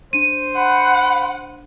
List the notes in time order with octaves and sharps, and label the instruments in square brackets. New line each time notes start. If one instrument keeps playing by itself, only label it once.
[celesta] D4 D#7 [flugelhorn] C5
[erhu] F#5 [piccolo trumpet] B5